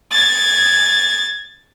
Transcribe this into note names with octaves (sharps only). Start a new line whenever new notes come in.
G#6 A6